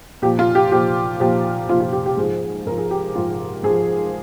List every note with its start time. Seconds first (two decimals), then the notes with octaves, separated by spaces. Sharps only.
0.22 A#2 F3 G4
0.39 F4
0.55 G4
0.71 A#2 F3 G4
1.20 A#2 F3 G4
1.69 A#2 F3 F4
1.80 F4
1.93 G4
2.06 G4
2.17 G#2 F3 G#4
2.66 G#2 A#4
2.70 F3
2.78 G#4
2.91 G4
3.16 G#2 F3 F4
3.63 G#2 F3 G#4